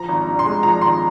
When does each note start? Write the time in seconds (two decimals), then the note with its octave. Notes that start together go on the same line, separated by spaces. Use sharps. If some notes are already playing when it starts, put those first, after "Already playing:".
Already playing: F3 A#5
0.09 G#1
0.27 G2
0.39 C6
0.46 G#3
0.63 F3 A#5
0.81 G#1 C6